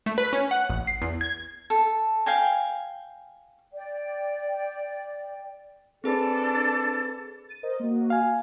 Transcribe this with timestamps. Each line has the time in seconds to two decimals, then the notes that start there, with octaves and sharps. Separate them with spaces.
0.06 A3
0.18 B4
0.33 C#4
0.51 F#5
0.70 A1
0.87 C7
1.02 E2
1.21 G#6
1.70 A4
2.26 F5 G5 G#5
3.73 D5 G5
6.04 C4 D4 G#4 A4 B4
7.49 A6 D#7
7.63 A#4 C5 D#5
7.80 A#3 F#4
8.10 F5 G#5